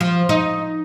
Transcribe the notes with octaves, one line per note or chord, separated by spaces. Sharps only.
F3
D#4